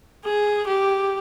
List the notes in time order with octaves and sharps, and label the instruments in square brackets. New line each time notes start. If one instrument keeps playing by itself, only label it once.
[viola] G#4
G4